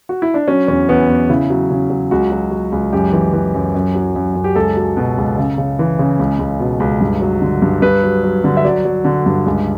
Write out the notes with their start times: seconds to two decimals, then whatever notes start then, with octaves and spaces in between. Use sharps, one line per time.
0.09 F#4
0.22 E4
0.34 D4
0.48 F#3 C#4
0.68 E2 C#4
0.89 E2 B3
1.09 E2
1.30 C#3 E4
1.50 F#3
1.71 C#3
1.90 F#3
2.11 C#2 F#4
2.32 F#3
2.52 F#3
2.72 C#2
2.93 F#2 G4
3.12 E3
3.33 E3
3.54 F#2
3.75 F#2
3.95 F#3
4.16 F#2
4.35 F#2
4.44 G4
4.56 C#2 A4
4.77 F#3
4.97 B2
5.18 C#2
5.38 C#3
5.58 C#3
5.79 E3
5.99 C#3
6.19 C#2
6.39 C#2
6.60 B2
6.80 C#2
7.01 G2
7.21 F#3
7.41 D3
7.62 G2
7.82 G2 B4
8.03 F#3
8.24 F#3
8.44 D3
8.57 E5
8.65 F#3 D5
8.85 F#3
9.05 D3
9.26 G2
9.46 C#2